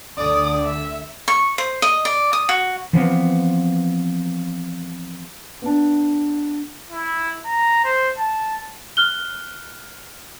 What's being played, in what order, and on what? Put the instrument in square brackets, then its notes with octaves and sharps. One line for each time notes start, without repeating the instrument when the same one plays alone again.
[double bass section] D2 D3 [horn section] D5 [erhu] D#6
[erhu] E5
[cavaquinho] C#6
C5
D#5
D5
D#6
F#4
[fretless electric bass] E3 F3 B3 C4
[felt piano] B3 D4
[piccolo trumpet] E4
A#5
C5
A5
[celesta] F6 F#6 G7